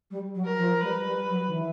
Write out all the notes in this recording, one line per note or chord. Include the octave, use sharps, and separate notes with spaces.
G3
F#3
A#4
F3
G3 B4
G3
F#3
D#3
E3